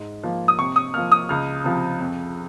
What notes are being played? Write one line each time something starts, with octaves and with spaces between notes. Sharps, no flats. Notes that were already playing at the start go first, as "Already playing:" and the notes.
Already playing: G#2
F3 A#3
D#6
C3 C#6
D#6
F3 A#3 F6
D#6
C#2 F6
C3 F3
F2